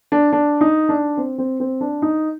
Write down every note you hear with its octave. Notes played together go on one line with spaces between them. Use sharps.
D4
D4
D#4
D4
C4
C4
C4
D4
D#4